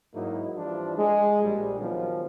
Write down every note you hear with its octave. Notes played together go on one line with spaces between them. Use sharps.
G#2 F#3 A#3 D#4 E4
E3 F3 G3 D4 F4
G#3
A#1 G3
D#3 F3 F#3 G#3 B3